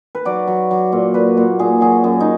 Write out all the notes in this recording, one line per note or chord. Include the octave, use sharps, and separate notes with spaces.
B4
F#3 D5
F#3
F#3
A#2
A#2 B4
A#2
A#2 G#4
F#3 G#4
F#2 G#4
D#4